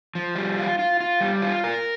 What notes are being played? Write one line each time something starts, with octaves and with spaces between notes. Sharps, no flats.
F3
G3
F4
F4
F4
G3
F4
A#4